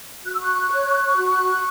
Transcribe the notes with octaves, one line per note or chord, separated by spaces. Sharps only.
F#4 F#6
E6
C#6 F#6
C#5
F#4